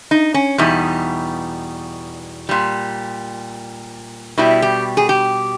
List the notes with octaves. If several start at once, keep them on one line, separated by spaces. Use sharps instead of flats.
D#4
C#4
E2 B2 G3 D#4
A#2 G3
B2 G3 E4
G4
G#4
G4